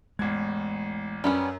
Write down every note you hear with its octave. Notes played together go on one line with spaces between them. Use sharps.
A1 E2 G#3 G#6
F#2 G3 B3 C#4